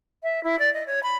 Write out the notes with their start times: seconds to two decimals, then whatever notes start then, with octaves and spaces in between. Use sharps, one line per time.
0.23 E5
0.44 E4
0.59 D5
0.74 D#5
0.87 C#5
1.03 B5